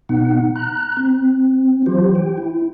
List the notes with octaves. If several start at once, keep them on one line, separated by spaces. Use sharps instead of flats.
B2 B3 D#4 F#5
A#5 F#6
C4
E3 F#3 F4 G4 C5
G5
E4